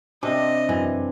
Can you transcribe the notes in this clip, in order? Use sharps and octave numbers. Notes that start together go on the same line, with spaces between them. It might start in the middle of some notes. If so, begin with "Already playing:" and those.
C3 C4 D4 D#5
F#2 E3